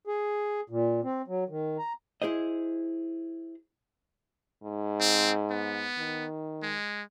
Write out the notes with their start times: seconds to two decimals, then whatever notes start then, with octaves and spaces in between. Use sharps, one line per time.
0.07 G#4
0.70 A#2
1.04 C4
1.28 F#3
1.49 D#3
1.78 A#5
2.22 E4 G#4 C5 D#5
4.63 G#2
5.00 C4
5.51 B3
5.98 D#3
6.63 G#3